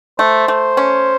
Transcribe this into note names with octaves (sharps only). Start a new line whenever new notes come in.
A3 C5
A3
C#4